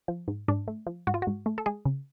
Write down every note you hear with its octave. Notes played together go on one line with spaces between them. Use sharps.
F3
G#2
G#2 D4
A3
F3
G#2 F#4
F4
G#2 F#4
A3
A4
G#3 G#4
C#3